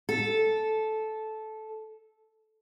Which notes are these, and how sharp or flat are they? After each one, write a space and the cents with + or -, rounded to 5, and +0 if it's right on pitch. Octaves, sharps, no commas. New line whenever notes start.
A4 -10